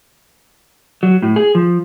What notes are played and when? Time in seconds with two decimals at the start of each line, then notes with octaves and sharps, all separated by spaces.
1.03 F#3
1.23 A2
1.36 G#4
1.55 F3